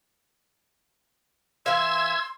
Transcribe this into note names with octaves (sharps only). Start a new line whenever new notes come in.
E3 E5 F5 C6 E6 G#6